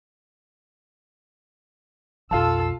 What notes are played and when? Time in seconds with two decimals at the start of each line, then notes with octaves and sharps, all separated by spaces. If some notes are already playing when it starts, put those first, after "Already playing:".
2.31 B1 F2 F4 A4 F5 A5 E6